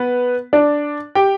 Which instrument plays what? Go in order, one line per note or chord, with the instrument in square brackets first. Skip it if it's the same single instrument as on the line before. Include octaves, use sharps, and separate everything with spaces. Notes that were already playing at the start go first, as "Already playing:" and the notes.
Already playing: [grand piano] B3 B4
D4 D5
G4 G5